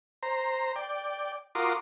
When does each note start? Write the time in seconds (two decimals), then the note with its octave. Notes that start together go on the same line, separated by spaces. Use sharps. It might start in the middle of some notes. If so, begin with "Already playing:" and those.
0.23 C5 A#5
0.76 D5 G5
1.55 F4 F#4 A#4 C6 D6 D#6